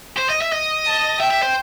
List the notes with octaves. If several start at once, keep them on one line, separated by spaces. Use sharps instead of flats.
C5
D#5
E5
D#5
A5
E5 G5
E5
C5